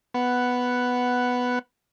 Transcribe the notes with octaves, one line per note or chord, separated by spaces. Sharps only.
B3 F#5